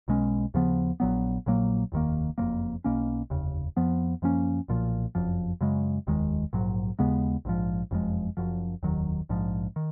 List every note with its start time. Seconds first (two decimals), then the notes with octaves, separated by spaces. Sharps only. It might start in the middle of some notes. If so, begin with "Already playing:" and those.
0.08 B1 B2 G#3 C#4
0.54 D#2 C#3 F3 B3
1.00 A#1 A#2 F#3 B3
1.46 A#1 A#2 F#3 A#3
1.92 F1 D#2 D#3 A#3
2.38 F#1 F2 F3 A#3
2.84 B1 B2 A#3 C#4
3.30 F1 D#2 C#3
3.77 F2 F3 B3
4.22 F#2 F3 A#3 C#4
4.68 B1 A#2 F3
5.15 F#1 F2 F3
5.61 F#2 C#3 G#3
6.07 F1 D#2 D#3 G#3
6.53 A#1 G#2 F#3
6.99 D#2 C#3 G#3 B3
7.45 A#1 G#2 F3
7.91 F#1 F2 F3 G#3
8.37 F#1 F#2 F3
8.83 F1 D#2 D#3 F#3
9.29 A#1 G#2 F3
9.76 D#3